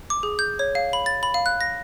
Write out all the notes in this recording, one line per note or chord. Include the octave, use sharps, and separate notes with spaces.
D6
G#4
G6
C#5
F5
B5
A6
B5
F5
F#6
A#6